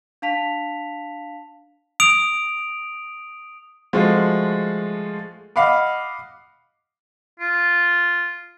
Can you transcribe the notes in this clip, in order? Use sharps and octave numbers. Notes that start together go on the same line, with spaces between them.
D4 F5 A5 B6 F7
D#6 D7 F7
F3 G#3 A3 F4 F#4
D#5 F5 F#5 B5 D6
F4